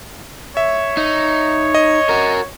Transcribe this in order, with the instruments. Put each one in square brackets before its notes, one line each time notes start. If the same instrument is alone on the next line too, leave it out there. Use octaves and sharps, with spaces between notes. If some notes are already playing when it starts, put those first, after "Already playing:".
[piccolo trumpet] C#5 [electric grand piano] E5
[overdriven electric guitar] D#4
[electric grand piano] D#5
[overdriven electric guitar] F#4 A#4